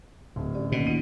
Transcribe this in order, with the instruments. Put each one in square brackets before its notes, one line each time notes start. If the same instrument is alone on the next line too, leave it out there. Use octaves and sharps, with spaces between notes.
[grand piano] D1
[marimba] C#4 G4 D5
[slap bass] B2 [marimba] D#3 A#3 C#4
[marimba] D#4 F4 [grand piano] D#7